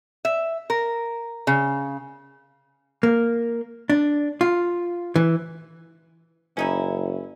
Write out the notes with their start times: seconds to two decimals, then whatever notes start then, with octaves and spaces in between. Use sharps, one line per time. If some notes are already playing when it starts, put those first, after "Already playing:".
0.25 E5
0.70 A#4
1.47 C#3
3.03 A#3
3.90 D4
4.41 F4
5.16 E3
6.57 F#1 C#4 D#4 E4